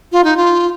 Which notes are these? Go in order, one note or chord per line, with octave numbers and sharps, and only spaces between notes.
F4
D#4
F4